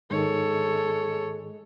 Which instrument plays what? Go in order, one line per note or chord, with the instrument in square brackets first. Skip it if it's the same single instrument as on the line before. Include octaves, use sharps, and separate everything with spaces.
[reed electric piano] G#2 D#3 [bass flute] G#3 [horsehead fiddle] A4 C#5